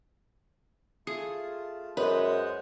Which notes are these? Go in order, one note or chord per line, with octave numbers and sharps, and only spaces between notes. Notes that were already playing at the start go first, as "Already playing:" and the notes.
A3 F4 G#4 A5
F#2 G#3 B4 C5 F#5 D#6